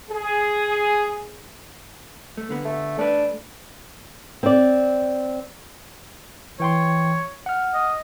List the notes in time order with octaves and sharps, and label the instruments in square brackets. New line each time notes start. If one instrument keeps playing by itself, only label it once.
[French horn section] G#4
[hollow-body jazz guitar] A3
D3 B3
[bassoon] A3
[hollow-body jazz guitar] A3 B4 [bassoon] D4
[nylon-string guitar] C4 D5
[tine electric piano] E3 G5 C6 [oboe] C#5
[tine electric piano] F#5 F6
[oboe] D#5